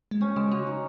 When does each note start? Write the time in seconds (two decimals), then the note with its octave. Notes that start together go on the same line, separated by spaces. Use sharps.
0.11 G#3
0.21 G3 C#4
0.36 C#3 G#3
0.51 D3 F#4
0.67 D#4